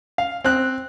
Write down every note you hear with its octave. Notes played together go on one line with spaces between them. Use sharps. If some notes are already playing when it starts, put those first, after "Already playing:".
F5
C4 F#6